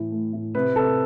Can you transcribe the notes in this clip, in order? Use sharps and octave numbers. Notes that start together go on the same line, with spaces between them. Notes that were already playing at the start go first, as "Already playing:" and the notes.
Already playing: A2 E3
A3
A2
C3 B4
C3 A4